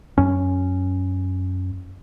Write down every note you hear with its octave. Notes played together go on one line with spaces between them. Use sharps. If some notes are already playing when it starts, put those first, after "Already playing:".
F#2 C#4